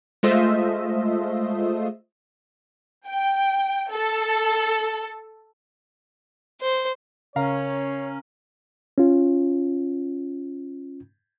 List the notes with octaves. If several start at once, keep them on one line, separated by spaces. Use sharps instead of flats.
G#3 A3 F4 C5 D#5 E5
G5
A4
C5
C#3 C#4 A#4 C#5 F5 A#5
C#4 F4